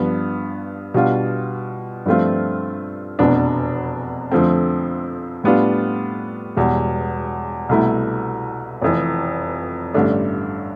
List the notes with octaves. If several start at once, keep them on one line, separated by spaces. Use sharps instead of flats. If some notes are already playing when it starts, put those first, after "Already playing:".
Already playing: G2 F3 B3
B2 G3 D4 F4
G2 F3 A3 C4 F4
F1 E2 B2 B3 D4
F2 D3 F3 A3 C4
A2 G3 B3 D4 F4
E1 E2 B2 G3
C2 B2 A3 E4
F1 F2 E3
A1 G2 D3 A3 D4